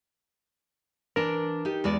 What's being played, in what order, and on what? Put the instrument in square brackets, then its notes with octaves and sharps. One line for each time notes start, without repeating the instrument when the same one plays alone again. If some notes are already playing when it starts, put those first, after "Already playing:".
[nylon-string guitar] E3 D4 [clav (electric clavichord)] A#4
[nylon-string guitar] D#4 G4
E2 G#3 D5